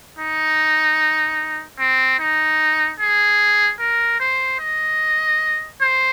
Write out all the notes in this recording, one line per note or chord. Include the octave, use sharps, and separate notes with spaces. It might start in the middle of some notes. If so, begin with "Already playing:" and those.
D#4
C4
D#4
G#4
A#4
C5
D#5
C5